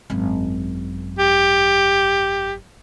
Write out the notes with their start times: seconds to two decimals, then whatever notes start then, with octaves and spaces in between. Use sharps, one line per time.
0.10 G#1 F#2
1.19 G4